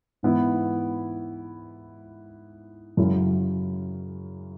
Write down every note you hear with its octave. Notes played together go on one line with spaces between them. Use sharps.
G#2 E3 B3 E4
F#2 C#3 F#3 C#4 E4